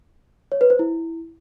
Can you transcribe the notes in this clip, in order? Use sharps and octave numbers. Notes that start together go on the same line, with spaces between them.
C#5
B4
C5
E4